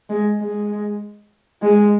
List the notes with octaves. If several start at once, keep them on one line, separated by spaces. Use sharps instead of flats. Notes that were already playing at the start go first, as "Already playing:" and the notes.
G#3
G#3
G#3